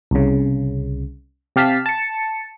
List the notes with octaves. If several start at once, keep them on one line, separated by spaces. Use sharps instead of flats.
C2 C#3
C3 G4 F5 A5 B6
A5 C#7